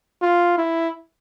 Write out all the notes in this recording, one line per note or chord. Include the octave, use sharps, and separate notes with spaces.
F4
E4